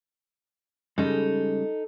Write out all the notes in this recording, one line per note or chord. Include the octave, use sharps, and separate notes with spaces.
C#3 G3 G#3 D#4 A4